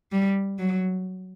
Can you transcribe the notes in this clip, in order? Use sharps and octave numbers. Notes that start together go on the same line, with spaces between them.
G3
F#3